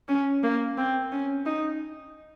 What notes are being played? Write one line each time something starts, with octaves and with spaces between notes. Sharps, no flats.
C#4
A#3
C4
C#4
D#4